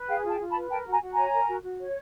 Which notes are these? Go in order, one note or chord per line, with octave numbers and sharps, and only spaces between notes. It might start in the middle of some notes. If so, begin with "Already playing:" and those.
Already playing: B4
G#4 F5 G5
F4
G5 A5
F4
A5 B5
B4
A#4 G5 A5
F#4 G#5 A#5
F#4
C#5 G#5 A#5
A#4
F#4
F#4
C#5